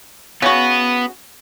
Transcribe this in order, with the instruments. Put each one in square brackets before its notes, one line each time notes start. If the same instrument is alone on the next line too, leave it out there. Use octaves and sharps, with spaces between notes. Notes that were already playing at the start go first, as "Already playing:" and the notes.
[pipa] C#3 F#4 [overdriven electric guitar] B3